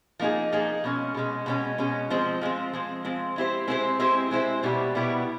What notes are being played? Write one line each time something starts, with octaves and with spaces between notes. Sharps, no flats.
F3 A#3 D#4 G#4
F3 A#3 D#4 G#4
B2 G#3 C#4
B2 G#3 C#4
B2 G#3 C#4
B2 G#3 C#4
F3 G#3 C4
F3 G#3 C4
F3 G#3 C4
F3 G#3 C4
G#3 C4 E4 G4 C5
G#3 C4 E4 G4 C5
G#3 C4 E4 G4 C5
G#3 C4 E4 G4 C5
B2 G3 B3 E4 G4
B2 G3 B3 E4 G4